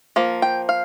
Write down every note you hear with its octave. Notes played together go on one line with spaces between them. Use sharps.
F3 A#3
G5
F5